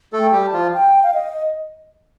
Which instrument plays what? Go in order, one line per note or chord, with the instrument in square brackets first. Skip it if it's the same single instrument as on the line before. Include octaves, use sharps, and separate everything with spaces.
[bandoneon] A3 A4
[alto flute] G5
[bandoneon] G3 G4
[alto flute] A5
[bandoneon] F3 F4
[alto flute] G5
F5
D#5